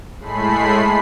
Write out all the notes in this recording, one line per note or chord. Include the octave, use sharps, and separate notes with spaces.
A2 G#3 A3 B5 C7